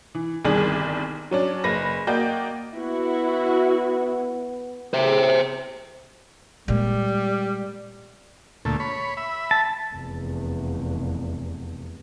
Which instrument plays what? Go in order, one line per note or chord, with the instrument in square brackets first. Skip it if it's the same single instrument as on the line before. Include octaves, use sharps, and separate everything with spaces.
[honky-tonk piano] E3
G1 C2 D#3 G#4 D5
F#3 C#4 D4
F#1 B4 A#6
A#3 F#4 D5 D#5 G5 G6
[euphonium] B3 [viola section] E4 F#4
[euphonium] A2 [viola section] G#4 [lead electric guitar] C5 E5
[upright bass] A#2 G#3 [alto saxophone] G3
[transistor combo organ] D2 A#2 A3
C#5 B5
E5 B5
[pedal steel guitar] A5
[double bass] F1 E2